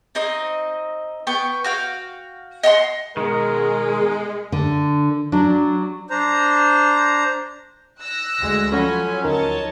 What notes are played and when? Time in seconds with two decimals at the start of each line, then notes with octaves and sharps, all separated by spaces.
0.15 C4 D#4 D#5
1.27 B3 G5 C#6
1.64 F#4 F5 G5
2.63 D#5 F#5 A#5 C6
3.17 B2 D#3 G#3 A#4
4.52 D3
5.32 F#3 D4
6.10 D4 C5 A#5
8.00 E6 F#6 A#6
8.40 D2 G#3
8.72 F3 F#3 C#4 A4 C#5 F#5 G#5 B5
9.24 D2 D#4 A#4 C#5 D#5 A5